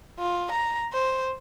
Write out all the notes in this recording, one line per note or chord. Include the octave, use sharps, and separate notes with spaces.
F4
A#5
C5